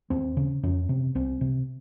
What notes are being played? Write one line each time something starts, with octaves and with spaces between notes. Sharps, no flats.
D#2 C4
C#3
F2 C#4
C3
C2 C4
C3